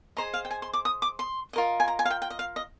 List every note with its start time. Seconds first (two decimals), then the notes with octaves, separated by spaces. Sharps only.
0.17 G#4 C5 D#5 A#5
0.34 F5
0.45 G5
0.51 G#5
0.62 C6
0.73 D6
0.85 D#6
1.02 D6
1.19 C6
1.53 F4 A#4 D#5
1.80 G#5
1.88 A#5
1.99 G#5
2.05 F5
2.11 G5
2.22 G5
2.30 D#5
2.39 F5
2.56 D#5